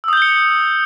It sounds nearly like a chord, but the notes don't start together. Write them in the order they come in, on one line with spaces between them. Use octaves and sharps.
E6 D#6 G6 G7 C#7